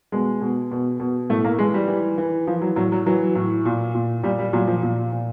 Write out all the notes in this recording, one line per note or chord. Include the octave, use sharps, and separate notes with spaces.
B2 G#3
B2
B2
B2
A2 A3
A#3
E3 G#3
G3
E3
E3
E3 F3
F#3
A2 F#3
F#3
E3 F#3
A2
A#2
A#2
A#2 G3
G3
A#2 F#3
F3
A#2
A#2